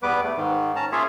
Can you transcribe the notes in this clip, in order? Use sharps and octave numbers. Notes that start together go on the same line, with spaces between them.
E2 G3 B3 B4 D6
A3
G#2 D#3
C#4 A5 A#5
A#3 C#4 F4 G#4 C#5 E5